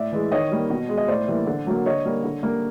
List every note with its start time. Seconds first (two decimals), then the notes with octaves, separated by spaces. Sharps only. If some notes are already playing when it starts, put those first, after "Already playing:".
Already playing: A2 D5 E5
0.12 E3 G#3
0.32 D#3 C#5 D#5
0.52 G3 A#3
0.70 B2
0.89 G#3
0.97 D#5
1.08 A2 C5 D5
1.28 E3 G3 A#3
1.47 D3
1.67 F#3 A#3
1.86 D3 C#5 D#5
2.06 G3 A#3
2.24 D3
2.43 G3 A#3